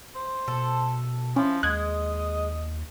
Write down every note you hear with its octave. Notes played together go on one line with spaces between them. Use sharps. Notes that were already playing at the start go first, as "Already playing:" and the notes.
C5
B2 A4
F3 C#4 E4
D#2 G#3 D#5 F#6 G#6